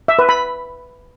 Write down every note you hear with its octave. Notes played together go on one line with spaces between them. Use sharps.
E5
B4
B5